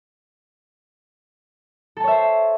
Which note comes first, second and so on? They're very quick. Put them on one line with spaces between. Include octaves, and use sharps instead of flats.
A4 A5 C#5 E5 C5